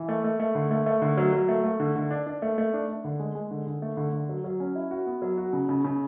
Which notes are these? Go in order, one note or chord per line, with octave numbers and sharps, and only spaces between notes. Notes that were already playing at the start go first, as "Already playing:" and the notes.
Already playing: E3
A3
A3
A3
D3
A3
A3
D3
F#3
F#3
A3
A3
D3
D3
D4
D4
A3
A3
D4
D4
D3
G#3
G#3
D3
D3
A3
D3
D3
F#3
F#3
C#4
E4
F#4
B3
F#3
F#4
C#3
C#3
C#3